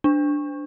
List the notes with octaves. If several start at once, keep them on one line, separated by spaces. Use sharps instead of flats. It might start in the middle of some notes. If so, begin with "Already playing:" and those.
D4